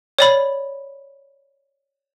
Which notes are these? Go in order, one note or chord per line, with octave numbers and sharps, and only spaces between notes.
C#5 D5 B5